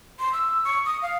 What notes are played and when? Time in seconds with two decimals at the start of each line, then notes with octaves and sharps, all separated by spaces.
0.19 C6
0.33 E6
0.64 C#6
0.86 D#6
1.02 F5